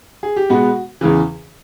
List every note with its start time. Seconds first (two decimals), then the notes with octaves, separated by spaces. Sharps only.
0.23 G#4
0.36 G4
0.49 B2 G#3 B3 F#4
1.01 E2 C#3 E3